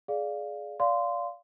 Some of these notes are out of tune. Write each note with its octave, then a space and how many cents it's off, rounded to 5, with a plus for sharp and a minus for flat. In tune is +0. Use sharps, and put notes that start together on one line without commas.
G#4 +15 D5 +0 F5 +0
D5 -25 F5 +0 C6 -15